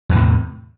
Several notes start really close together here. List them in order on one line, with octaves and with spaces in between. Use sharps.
E2 E3 A2 C3